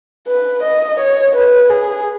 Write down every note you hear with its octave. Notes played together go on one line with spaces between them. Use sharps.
B4
D#5
C#5
B4
G#4